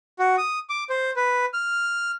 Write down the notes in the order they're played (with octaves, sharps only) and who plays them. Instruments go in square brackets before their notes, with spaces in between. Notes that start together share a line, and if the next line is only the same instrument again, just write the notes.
[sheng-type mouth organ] F#4
D#6
D6
C5
B4
F6